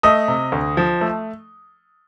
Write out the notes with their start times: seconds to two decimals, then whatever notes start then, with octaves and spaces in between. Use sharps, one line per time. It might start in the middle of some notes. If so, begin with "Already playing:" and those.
0.03 A3 D#5 D#6
0.28 C3
0.52 D2
0.77 F3
1.01 A3